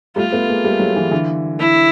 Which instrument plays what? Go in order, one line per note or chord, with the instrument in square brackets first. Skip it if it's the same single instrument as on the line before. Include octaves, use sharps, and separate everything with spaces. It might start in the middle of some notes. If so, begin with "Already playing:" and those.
[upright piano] G3 A3 [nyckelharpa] F4
[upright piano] A3 B3
G#3 A#3
G3 A3
F#3 G#3
E3 F#3
D3 E3
[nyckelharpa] E4